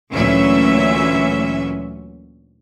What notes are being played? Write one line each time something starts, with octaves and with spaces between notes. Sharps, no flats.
D2 A#2 E3 F#3 C#4 E5